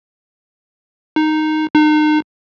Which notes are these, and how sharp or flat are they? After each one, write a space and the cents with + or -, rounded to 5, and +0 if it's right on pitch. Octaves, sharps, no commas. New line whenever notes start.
D#4 -5
D#4 -35